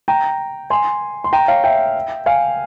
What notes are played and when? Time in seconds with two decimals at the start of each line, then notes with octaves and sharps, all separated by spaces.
0.08 G5 A#5
0.70 G#5 C6
1.24 C6
1.33 G5 A#5
1.48 C#5 F5
1.64 E5 G5
2.26 F5 G#5